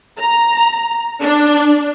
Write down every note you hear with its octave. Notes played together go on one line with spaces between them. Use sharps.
A#5
D4